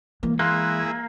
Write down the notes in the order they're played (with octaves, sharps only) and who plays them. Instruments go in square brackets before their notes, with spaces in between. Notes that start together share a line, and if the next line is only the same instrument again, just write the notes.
[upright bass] E3 G#3 [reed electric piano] A#3
[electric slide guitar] A#3 [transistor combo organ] E4 G#4 [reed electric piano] C6 F#6